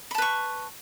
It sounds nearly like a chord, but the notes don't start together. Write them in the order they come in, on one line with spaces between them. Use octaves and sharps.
B5 A5 B4 C#6